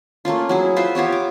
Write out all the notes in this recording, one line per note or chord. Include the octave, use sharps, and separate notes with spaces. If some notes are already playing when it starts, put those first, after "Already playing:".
A3 A#3 C#4 F4
F#3 E4 G#4
F4 B4 C5 E5
B3 F4 G4 C#5
D6